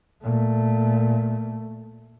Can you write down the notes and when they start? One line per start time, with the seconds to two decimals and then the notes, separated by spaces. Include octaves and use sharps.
0.23 A#2 A3